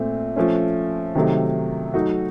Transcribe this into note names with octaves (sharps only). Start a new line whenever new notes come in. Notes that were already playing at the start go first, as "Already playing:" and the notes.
Already playing: A#2 A3 C4
F3 A3 C#4
C3 D#3 F#3 A3
F#3 A3 D#4 F#4